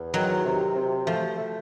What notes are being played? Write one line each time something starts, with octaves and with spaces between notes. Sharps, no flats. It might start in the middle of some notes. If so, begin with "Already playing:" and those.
Already playing: E2
D#3 F#3
C3
C3
F3 A3
A3